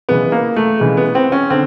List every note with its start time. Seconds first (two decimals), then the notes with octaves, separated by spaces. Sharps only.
0.09 C#3 E3 G#3 B3
0.32 A#3
0.56 A3
0.80 C#3 E3 G#3
0.97 B3
1.15 C4
1.32 C#4
1.50 D3 C4